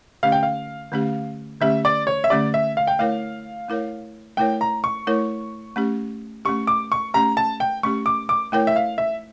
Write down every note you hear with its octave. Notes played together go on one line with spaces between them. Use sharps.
D3 A3 C#4 G4 F5
G5
F5
D3 A3 C#4 G4
D3 A3 C#4 G4 E5
D5
C#5
E5
D3 A3 C#4 G4 D5
E5
F5
G5
A3 E4 A#4 C#5 F5
A3 E4 A#4 C#5
A3 E4 A#4 C#5 G5
A#5
C#6
A3 E4 A#4 C#5
A3 C#4 G4
A3 C#4 G4 C#6
D6
C#6
A3 C#4 G4 A#5
A5
G5
A3 C#4 G4 C#6
D6
D6
A3 E4 A#4 C#5 G5
E5
F5
E5